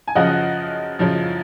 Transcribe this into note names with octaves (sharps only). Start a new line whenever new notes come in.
G#5
F#2 C#3 F3 D#5 F#5
F#2 C#3 F3